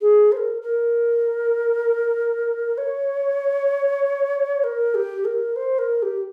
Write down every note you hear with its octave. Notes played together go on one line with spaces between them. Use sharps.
G#4
C5
A#4
A#4
C#5
A#4
G4
A#4
C5
A#4
G4